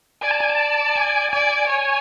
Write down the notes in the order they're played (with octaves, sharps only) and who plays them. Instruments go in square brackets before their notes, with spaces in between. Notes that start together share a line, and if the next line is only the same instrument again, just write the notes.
[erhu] D5 [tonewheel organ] G#5
[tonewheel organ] A5
G#5
A5
G#5
[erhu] D5 [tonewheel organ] G#5
[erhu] C#5 [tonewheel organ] G#5